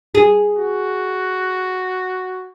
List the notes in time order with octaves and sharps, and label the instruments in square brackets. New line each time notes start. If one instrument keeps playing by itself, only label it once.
[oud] G#4
[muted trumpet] F#4